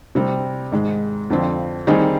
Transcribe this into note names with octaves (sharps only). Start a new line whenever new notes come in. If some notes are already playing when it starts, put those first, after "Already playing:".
C3 G3 C4
G#2 D#3 G#3
F2 D3 F3 C4 F4
D#3 G3 C4 D#4 G#4